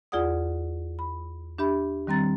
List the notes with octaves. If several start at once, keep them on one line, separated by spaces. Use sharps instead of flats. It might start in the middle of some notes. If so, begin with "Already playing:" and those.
E2 F4 G#4 D5 F#5 D#6
B5
D4 G4 E5 B5
D#3 G3 C4 A#5 A6